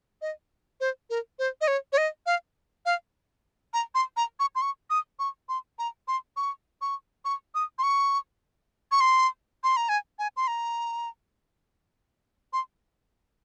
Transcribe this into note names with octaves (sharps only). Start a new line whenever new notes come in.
D#5
C5
A#4
C5
D#5
C#5
C#5
D#5
F5
F5
A#5
C6
A#5
C#6
C6
C#6
D#6
C#6
C6
A#5
C6
C#6
C#6
C#6
D#6
C6
C#6
C#6
C6
C6
A#5
G#5
G#5
C6
A#5
C6